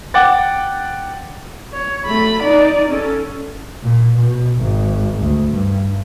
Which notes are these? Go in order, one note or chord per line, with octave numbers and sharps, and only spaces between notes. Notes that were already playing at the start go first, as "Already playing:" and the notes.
F#5 G5 D6 F#6 A6
C#5
A3 B5
D#4 D5
C#4 A4
A#2
B2
G#1
D2
G2